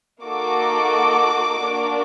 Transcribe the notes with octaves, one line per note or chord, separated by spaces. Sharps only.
A#3 D#4 F#4 A4 D6
A#3 D4 F#4